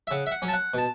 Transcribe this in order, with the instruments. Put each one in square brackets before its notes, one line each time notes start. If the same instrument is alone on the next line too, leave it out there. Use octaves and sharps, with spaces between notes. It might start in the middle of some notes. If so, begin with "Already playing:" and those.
[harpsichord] E5
C#3 F#5
E5
F#5
F#3 C#4
A5
F#5
B2 A5